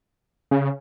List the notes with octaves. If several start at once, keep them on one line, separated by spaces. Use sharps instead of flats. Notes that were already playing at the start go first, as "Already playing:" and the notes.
C#3